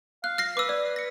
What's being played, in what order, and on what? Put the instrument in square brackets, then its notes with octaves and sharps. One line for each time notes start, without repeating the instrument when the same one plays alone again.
[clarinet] F5 [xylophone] F#6
[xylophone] F6 A#6 C7
[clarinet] B4 [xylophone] D6 E6
[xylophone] D5
A#6 C#7